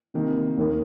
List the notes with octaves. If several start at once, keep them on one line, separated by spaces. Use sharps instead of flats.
C3 D#3 A#3
D#2 D#3 A#3